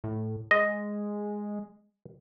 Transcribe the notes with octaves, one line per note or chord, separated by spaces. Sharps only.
A2
G#3 D#5